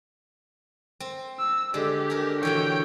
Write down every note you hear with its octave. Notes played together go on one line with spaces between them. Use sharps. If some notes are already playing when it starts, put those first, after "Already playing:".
C4
E6
D3 G#3 G4 D5
G#4 A#4
B2 D3 E3 C#5 G5